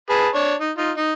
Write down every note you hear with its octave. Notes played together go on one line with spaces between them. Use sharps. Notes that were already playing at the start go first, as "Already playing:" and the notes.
G#4 B4 A5
D4 C#5
D#4
D#4 F4
D#4